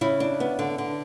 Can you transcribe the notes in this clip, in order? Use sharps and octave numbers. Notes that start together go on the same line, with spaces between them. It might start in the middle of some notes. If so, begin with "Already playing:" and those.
C#3 E4
D4
B3
D3
D3